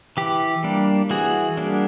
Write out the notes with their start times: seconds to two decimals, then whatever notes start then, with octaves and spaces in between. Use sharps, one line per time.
0.17 E3 G4
0.64 G3 A#3 D4
1.10 E3 F#4 G#4
1.57 G3 A#3 D4